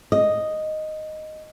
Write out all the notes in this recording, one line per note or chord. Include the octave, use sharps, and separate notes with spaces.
D#5